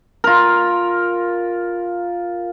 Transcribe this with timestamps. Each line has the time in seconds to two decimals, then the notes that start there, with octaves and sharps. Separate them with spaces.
0.24 F4 A#4